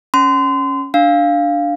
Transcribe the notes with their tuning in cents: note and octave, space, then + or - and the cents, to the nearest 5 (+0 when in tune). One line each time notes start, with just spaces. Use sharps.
C#4 +0 C6 -30
D4 +0 F5 +0